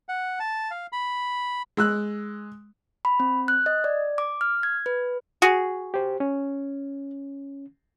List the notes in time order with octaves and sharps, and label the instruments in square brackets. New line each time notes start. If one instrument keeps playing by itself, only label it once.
[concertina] F#5
A5
F5
B5
[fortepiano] G#3 E6 F#6
[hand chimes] B5
C4
F#6
D#5
D5
D6
F6
G#6
B4
[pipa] F#4 G#4
[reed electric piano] G4 C5
C#4